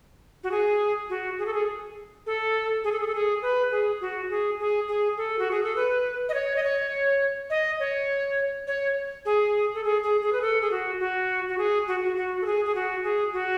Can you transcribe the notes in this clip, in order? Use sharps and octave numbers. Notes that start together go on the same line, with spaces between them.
F#4
G#4
F#4
G#4
A4
G#4
A4
G#4
A4
G#4
A4
G#4
B4
G#4
F#4
G#4
G#4
G#4
A4
F#4
G#4
A4
B4
D#5
C#5
D#5
C#5
D#5
C#5
C#5
G#4
A4
G#4
G#4
G#4
B4
A4
G#4
F#4
F#4
F#4
G#4
F#4
F#4
F#4
A4
G#4
G#4
F#4
G#4
F#4